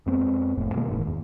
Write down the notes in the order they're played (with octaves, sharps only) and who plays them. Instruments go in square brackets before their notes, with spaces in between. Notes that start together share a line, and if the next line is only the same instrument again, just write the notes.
[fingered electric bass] F2 G#3 B3 C4
F1 F2 A2
B2 D#3 G#3 A#3
E1 G#2 D#3
E2